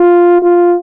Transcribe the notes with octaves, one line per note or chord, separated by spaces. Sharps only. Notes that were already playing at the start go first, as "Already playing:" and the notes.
Already playing: F4
F4